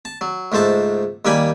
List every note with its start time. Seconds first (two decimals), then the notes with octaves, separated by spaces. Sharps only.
0.05 A5
0.21 F#3
0.52 C#2 G#2 A3 C5 A5
1.25 D#2 G3 A#3 G5 G#5 B5